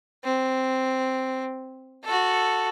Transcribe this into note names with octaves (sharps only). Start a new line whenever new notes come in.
C4
F#4 A4